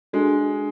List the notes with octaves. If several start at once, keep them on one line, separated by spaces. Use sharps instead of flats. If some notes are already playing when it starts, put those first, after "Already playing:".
G#3 D4 F#4 A4